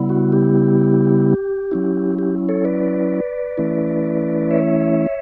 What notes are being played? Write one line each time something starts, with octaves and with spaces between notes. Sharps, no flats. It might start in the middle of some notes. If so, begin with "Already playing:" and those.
Already playing: C#3 G3 B3 E4
F#4
G4
F#3 C#4 E4
G4
A4 C#5
B4 D5
E3 A3 C#4 E4
C#5 E5